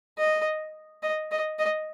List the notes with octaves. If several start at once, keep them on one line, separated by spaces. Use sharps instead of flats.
D#5
D#5
D#5
D#5